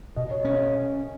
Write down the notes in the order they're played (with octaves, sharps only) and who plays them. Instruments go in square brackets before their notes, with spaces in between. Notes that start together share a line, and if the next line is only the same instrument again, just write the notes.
[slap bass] B2 [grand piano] D#5
[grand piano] C#5
[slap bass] C#4 [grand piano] C#5